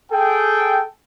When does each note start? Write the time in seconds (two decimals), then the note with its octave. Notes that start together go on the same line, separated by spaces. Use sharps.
0.11 G#4 A4 G5